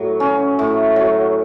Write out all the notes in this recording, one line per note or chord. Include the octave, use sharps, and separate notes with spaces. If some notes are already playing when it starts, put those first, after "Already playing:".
Already playing: A2 F#3
C#4
A2
F#3